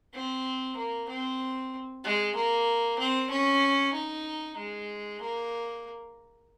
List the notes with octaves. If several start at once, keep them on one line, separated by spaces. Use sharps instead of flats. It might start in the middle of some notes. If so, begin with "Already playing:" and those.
C4
A#3
C4
G#3
A#3
C4
C#4
D#4
G#3
A#3